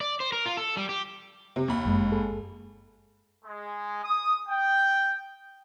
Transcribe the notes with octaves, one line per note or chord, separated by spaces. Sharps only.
D5
C5
A#4
F4
A4
G3
G4
C3
D#2 B5
G1 F#2 G#3
G#4 A4
G#3
D#6
G5